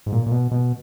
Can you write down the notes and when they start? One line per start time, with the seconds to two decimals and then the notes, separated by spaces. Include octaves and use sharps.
0.06 G#2
0.12 A#2
0.26 A#2
0.31 B2
0.51 B2